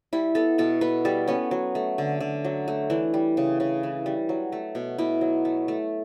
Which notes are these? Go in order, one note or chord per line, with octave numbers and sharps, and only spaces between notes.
G3 E4
B3 A4
B2 A4
B2 B4
G3 A4
B3 C#4
F#3
A3
D3
D3
F#3
A3
E3 D4
G3
C#3
C#3
E3
G3
F#3
A3
B2
B2 E4
F#3
A3
A3